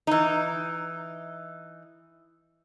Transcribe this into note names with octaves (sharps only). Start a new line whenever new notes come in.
E3 D#4